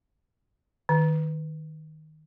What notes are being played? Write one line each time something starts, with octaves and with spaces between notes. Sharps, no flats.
D#3